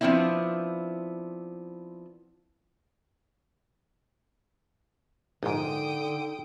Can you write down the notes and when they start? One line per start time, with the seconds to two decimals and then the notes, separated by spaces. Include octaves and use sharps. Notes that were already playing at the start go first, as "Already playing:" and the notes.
0.01 F3 B3 C4 D4 E4
5.43 A#1 G#2 D3 D#4 G5 D#6 D7